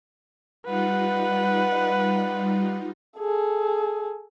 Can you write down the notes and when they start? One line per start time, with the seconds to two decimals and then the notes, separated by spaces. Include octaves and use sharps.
0.65 G3 D#4 F4 B4 F#5
3.18 G#4 A4